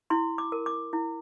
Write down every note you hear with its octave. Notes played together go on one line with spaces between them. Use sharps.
E4 C6
D6
A#4
D6
E4